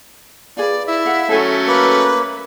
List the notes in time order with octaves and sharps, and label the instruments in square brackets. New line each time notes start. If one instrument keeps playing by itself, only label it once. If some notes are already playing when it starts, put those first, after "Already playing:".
[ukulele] F4 G#4 B4 [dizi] D5
[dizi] E4 [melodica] E5
[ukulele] F5 F#5
[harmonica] F#3 A3 C#4 [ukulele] A4 G#5
[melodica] A#3 [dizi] B4